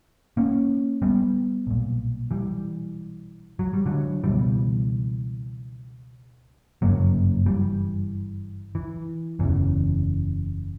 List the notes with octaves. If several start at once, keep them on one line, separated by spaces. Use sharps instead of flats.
A#3 C#4
G3 B3
B1 A#2
E3 G3
F#3
G3
D3 F#3
C#2 B2 E3 G3
G1 F#2 C#3 F#3 A#3
E3 G3
E3
F#1 E2 C#3 E3